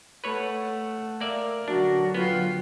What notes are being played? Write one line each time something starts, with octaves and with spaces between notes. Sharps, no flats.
A3 B4 C#5 F#5
A#3 A#4 D5 E5
D3 F#3 D4 F#4
B3 F4 G5 C6